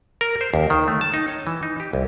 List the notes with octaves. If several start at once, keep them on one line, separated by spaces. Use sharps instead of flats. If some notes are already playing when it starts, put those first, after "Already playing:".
A#4
C5
D#2
D#3
A3
A5
D#4
C#5
E3
D#4
G4
C2